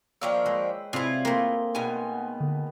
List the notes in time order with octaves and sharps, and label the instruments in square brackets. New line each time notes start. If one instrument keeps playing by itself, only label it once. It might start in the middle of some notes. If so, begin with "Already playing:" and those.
[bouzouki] D#3 F3 D4 [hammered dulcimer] A#3 C#5 G5 [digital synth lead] E6
[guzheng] G#3 [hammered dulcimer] B4 C5
[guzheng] C3 [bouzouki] E4 F4 [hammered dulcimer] G#4 [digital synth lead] D5
[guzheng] A3 A#3 [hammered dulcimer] C4 [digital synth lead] C6
[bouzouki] B2 G#5 [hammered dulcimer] D#3 B3
[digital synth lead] D3